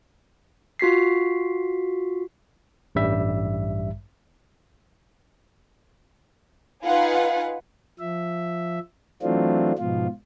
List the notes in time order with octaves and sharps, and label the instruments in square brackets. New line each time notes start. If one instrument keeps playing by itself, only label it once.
[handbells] F4 F#4 B6 C7
[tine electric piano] A1 G2 G3 E5
[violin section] D#4 F4 B4 F5 F#5 G#5
[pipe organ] F3 E5
E3 F#3 A3 C4 D4 F4
G#2 B2 F3 F4